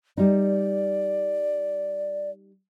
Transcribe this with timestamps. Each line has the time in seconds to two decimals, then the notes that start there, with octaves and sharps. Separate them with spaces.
0.17 G3 D#4 D5